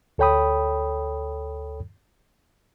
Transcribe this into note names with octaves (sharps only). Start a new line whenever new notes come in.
D2 A4 C#5 G5 B5 D#6